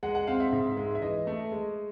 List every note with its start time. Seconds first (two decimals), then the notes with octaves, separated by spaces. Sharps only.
0.03 G#3 F#5
0.15 F#5
0.27 C4 F5
0.40 E5
0.53 G#2
0.77 G#3
0.95 E5
1.02 E3 D#5
1.27 A3
1.52 G#3